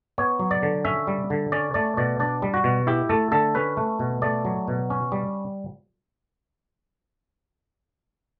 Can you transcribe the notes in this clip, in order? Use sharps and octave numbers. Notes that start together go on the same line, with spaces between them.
B3 C#5
F#3
D5
D3
C#4 E5
G3
D3
C#4 D5
A3 D5
B2 D5
D4 D5
G3
F#4
B2
E4 G4
A3 A4
D3 A4
C#4 B4
A3
B2
A3 D5
F#3
B2
C#4
G3